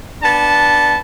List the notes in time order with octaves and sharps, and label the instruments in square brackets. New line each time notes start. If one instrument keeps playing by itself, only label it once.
[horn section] B3 D4 A5